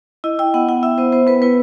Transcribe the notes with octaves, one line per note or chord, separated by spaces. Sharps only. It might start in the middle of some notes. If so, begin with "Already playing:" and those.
E4 D#5
E4 G5
B3 F#5
E4 F#5
E4 E5
B3 C5
B3 C5
B3 B4
E4 B4